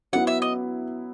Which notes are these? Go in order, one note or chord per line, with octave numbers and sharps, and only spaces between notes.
F#3 B3 E4 F#5
E5
D#5